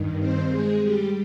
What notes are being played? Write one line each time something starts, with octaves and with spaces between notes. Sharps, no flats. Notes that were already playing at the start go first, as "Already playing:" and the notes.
Already playing: G2 D#3
C4 C5
G#3 G#4
G3 G4